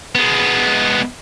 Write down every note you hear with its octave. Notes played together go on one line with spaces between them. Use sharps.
G#3 B3